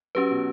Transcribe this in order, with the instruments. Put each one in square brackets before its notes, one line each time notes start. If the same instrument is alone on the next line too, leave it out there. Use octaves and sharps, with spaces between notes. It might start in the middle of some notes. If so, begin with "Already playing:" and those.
[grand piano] F#3 [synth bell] C#4 G4 B4
[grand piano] B2